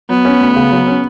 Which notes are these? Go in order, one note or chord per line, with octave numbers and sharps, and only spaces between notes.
F#3 B3
C#4
D2
C#3
F#3
C#4